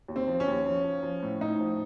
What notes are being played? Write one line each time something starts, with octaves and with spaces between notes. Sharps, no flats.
D#2
C4
F3
C#4
D#2
F3
F3
F3
A2
A2 D#4
F3